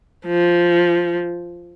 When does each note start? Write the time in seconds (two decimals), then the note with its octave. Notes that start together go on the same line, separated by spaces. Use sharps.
0.26 F3